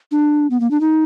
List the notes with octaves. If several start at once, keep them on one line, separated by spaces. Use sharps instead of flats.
D4
B3
A#3
D4
D#4